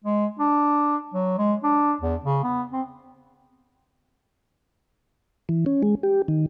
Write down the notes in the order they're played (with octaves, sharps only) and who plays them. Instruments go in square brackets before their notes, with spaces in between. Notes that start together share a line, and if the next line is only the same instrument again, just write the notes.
[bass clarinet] G#3
D4
F#3
G#3
D4
E2
C#3
B3
C4
[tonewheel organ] E3
C#4
G#3
G4
D#3